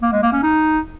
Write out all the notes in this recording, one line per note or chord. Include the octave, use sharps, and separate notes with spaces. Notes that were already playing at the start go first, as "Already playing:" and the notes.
A#3
G#3
A#3
C#4
D#4